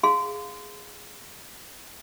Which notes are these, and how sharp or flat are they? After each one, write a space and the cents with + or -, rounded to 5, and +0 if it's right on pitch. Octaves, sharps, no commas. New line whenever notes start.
G#4 +0 F5 +10 C6 -25